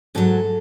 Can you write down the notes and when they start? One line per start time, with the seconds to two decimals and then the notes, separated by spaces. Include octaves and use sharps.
0.15 G#2 F#3 A4